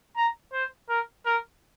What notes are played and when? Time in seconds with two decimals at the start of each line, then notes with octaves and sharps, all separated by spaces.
0.17 A#5
0.53 C5
0.89 A#4
1.26 A#4